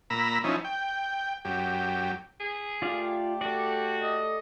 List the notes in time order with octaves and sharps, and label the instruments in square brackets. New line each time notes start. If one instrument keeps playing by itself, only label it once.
[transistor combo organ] A#2 A#5 B5 E6
F3 C#4 D#4 E4
G5
F#2 G4
[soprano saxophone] G#4
[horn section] A3 G4 [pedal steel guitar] F4 D5 F5
[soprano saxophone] F#4 [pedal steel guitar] A4 D5
[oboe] D#5